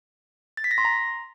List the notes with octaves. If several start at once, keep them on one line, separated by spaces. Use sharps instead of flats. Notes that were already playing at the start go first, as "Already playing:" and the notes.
A6
B6
A#6
C6
A#5